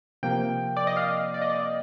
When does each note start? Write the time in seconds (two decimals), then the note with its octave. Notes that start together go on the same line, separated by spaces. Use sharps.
0.23 C3 F3 A#3 G5
0.77 D5
0.87 D#5
0.97 F5
1.34 D5
1.42 D#5
1.50 D5